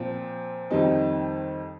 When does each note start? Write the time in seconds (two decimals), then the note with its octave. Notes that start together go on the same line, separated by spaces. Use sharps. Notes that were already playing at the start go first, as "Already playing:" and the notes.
Already playing: A#2 F3 C4
0.71 F2 D#3 G3 C4 D#4